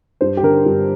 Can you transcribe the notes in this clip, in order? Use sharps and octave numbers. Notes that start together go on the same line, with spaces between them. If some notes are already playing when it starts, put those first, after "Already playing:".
G2 C5
G4
D3 A#4
G2